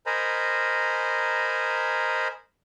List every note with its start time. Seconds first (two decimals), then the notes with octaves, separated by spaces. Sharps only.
0.06 A#4 C5 D#5 G#5 A#5 B5